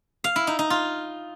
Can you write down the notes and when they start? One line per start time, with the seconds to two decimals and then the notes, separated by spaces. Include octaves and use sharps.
0.24 F5
0.36 E4
0.47 D#4
0.59 D#4
0.70 F4